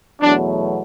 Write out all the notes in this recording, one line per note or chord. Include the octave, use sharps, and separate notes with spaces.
E2 B2 F#3 A3 D4